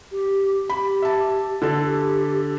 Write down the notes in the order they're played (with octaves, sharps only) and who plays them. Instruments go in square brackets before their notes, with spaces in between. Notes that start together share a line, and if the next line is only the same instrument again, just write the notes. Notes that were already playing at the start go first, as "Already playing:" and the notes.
[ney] G4
[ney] G4 [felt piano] B5
[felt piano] E5 A5
D3 A4
[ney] G4